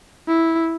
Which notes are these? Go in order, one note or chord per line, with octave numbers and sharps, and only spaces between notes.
E4